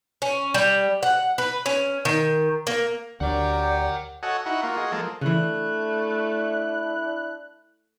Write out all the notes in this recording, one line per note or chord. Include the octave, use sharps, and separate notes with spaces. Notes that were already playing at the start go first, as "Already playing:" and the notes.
C#4
G3
F#5
B4
C#4
D#3
A#3
D2 G4 A#4 C#5 D5 F#5 G5
F#4 A4 C#5 D#5 F#5 G#5
D#4 E4 F#4 F#5
A#3 F4 F#4
F#4 G#4 D#5
F3 G#3 A#3 A4
C#3 E3 A3 D4 E4 F#6